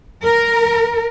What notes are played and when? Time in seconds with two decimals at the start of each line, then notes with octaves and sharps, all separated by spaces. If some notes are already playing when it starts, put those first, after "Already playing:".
0.23 A#4